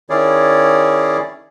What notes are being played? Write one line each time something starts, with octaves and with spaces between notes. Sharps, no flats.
D#3 C#4 E4 G#4 C#5 D5